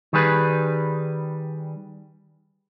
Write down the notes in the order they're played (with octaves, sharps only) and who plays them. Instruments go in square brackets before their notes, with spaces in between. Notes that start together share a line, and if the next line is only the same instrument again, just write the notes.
[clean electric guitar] D#3 G3 G#4 B4